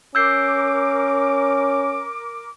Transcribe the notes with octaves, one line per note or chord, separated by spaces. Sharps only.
C#4 A#4 D6 E6 G6 C7